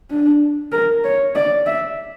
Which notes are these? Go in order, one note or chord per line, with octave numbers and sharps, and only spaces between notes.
D4
A#4
C#5
D5
E5